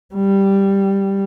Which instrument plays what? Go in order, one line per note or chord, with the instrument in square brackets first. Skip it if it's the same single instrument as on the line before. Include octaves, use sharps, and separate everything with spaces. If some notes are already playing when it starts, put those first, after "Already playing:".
[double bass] G3